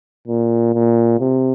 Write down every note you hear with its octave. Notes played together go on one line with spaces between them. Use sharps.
A#2
A#2
C3